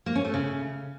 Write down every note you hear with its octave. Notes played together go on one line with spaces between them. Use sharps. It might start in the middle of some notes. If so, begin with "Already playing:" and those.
A#3
C#4
A3
C#3